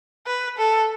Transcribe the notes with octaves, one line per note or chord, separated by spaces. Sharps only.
B4
A4